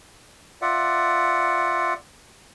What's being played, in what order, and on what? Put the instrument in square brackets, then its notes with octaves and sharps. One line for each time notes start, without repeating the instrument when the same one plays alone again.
[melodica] F4 D5 E5 F#5